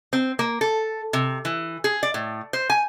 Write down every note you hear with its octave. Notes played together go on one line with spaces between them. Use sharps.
C4
A#3
A4
C3
E3
G#4
D5
A2
C5
G#5